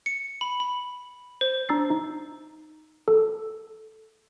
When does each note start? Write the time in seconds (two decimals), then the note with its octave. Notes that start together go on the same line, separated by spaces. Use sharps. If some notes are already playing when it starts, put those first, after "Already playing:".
0.06 C#7
0.41 B5
0.60 B5
1.41 C5
1.69 D4 A#5 E6 A6 C7
1.90 D#4
3.08 A4